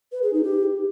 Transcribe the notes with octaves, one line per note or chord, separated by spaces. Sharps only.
B4
G#4
D#4
G4